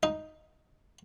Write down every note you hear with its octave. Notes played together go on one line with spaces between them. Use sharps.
D#4